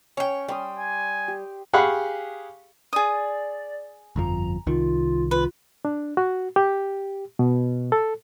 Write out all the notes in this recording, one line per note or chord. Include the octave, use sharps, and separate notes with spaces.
C#4 C#5 G5
G3 G5 C6 D#6
G#5
G4
G4 G#4 F5 F#5 B5 C#6
G#4 D5 D#6
G1 F2 F3 A#5
C2 D#3 F4
F4 B4
D4
F#4
G4
B2
A4